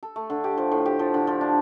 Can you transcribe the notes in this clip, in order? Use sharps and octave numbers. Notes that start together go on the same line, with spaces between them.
A4
A3
D3
G4
F3
A2
G4
F3
D3
F3
D4